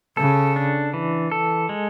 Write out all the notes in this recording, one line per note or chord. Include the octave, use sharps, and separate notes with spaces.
C#3 A4
D4
E3
A4
G#3